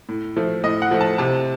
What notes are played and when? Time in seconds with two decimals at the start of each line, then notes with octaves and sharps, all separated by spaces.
0.09 A2
0.37 F3 A3
0.64 A2 D#5
0.82 F#5
0.91 F3 A3
1.01 A5
1.18 C3 A5